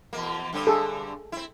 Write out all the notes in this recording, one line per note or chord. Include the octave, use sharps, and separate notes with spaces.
E2 B2 A#3
G2 D3 C4
G#4 A4
C4 E4